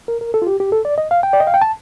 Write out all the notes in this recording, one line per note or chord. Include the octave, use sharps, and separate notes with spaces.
A#4
A#4
A4
F4
G4
G4
A4
D5
D#5
F5
G5
D5
D#5
F5
G5
A5